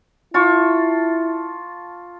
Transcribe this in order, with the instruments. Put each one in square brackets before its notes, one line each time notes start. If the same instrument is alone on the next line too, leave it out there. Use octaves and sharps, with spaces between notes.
[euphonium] E4 [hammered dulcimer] F4 A5 C#6